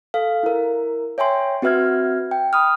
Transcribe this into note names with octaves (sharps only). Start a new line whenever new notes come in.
A4 F5
E4 A#4
C#5 E5 G5 G#5 C6
C4 F#4 B4 E5 F6 G#6
G5
B5 D#6 F6